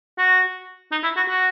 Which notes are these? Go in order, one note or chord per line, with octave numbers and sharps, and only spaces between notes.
F#4
D#4
E4
F#4
F#4